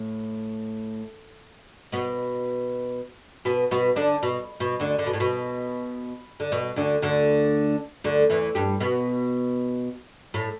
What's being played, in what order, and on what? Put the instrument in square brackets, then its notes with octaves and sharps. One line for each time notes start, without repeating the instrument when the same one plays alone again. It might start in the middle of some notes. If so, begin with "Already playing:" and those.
Already playing: [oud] A2
B2 B3
B2 B3
B2 B3
D3 D4
B2
B2
D2 D3
D3
B2
A2
B2
D3
B2
D2 D3
D2 D3
D2 D3
E2 E3
G2 G3
B2 B3
A2 A3